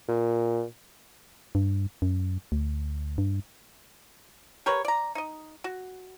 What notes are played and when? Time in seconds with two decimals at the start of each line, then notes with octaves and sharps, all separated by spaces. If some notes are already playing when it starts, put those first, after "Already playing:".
0.08 A#2
1.55 G2
2.02 F#2
2.52 D2
3.18 G2
4.66 G4 A#4 B4 C#5
4.85 D5 A#5
5.15 D#4 D#5
5.64 F#4